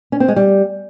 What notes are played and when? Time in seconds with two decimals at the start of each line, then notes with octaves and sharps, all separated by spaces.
0.12 C#4
0.20 C4
0.28 G#3
0.36 G3